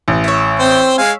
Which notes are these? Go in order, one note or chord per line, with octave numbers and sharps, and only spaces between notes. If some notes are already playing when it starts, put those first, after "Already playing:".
A1
C#5 E5
C4 C5 G5
G#3 F5 G#5